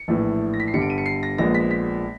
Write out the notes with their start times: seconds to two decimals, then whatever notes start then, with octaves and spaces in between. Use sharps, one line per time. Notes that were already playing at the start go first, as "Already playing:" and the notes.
Already playing: C#7
0.08 A#1 A2 E3
0.54 A#6
0.60 B6
0.68 C7
0.74 G1 G2 D3 G3 C#7
0.82 D7
0.90 D#7
0.98 C#7
1.06 C7
1.23 A#6
1.38 A#1 A#2 F3 G#3 B3 A#6
1.54 B6
1.71 B6